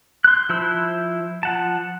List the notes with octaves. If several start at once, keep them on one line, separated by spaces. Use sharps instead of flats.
C6 F#6
F3 E4 C5 B5 E6
F3 F#5 A5